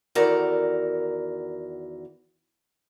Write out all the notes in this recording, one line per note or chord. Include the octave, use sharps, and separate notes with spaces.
E2 D#3 F#4 A4 A#4 D5